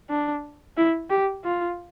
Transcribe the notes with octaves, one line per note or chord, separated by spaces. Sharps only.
D4
E4
G4
F4